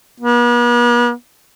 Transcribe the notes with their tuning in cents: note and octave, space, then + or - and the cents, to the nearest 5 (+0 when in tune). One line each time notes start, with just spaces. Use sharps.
B3 -45